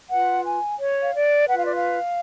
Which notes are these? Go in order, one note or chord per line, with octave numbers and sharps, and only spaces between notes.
F4 B4 F#5
G#5
C#5
F5
D5
F4 B4 F#5
F5
D5
F5